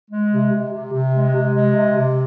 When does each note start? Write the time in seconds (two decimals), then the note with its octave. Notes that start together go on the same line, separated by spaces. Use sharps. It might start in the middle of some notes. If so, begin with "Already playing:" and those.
0.11 G#3
0.32 C3
0.52 C3
0.73 C3
0.93 C3
1.14 G#3
1.35 C3
1.54 G#3
1.75 C3
1.96 C3